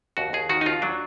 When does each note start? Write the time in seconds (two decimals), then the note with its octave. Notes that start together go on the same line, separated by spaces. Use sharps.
0.17 D#2 F#4
0.33 D#2 G#4
0.49 D#3 F#4
0.61 D#4
0.66 D#2 F4
0.82 F#3 D4